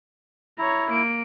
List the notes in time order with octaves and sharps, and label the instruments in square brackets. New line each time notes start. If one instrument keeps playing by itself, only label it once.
[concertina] E4 [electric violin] C#5 A#5
[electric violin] A#3 D7